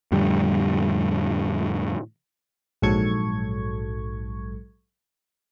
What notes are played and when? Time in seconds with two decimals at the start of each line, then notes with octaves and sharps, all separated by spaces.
0.12 F2 A2 D3 G3
2.82 A#1 G#2 F#3 A4 C#6 G#6